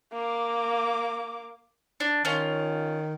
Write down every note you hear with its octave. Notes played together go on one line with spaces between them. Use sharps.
A#3 D6
D4
D#3 C#4 F4